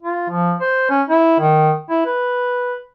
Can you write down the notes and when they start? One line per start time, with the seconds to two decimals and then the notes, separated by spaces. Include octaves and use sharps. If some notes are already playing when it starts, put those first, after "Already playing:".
0.03 F4
0.30 F3
0.60 C5
0.90 C#4
1.09 E4
1.40 D#3
1.90 E4
2.05 B4